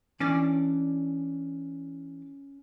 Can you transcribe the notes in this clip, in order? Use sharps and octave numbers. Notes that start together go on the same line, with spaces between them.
E3 C#4 D4 D5